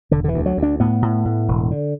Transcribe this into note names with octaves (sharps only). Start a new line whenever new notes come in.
E1 D3
D3
E3
D2
F#3
D2
D4
A2 B3
A2
A2
E1
D3